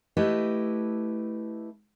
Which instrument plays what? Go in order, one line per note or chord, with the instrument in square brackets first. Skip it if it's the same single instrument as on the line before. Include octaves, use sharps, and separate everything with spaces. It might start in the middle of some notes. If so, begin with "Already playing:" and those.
[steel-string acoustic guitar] A3 E4 G4 B4 D#5